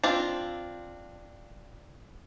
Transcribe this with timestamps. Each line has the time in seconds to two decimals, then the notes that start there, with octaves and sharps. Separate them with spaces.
0.03 C4 D4 F4